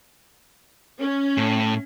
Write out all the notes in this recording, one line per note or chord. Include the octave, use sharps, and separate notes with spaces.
C#4
A2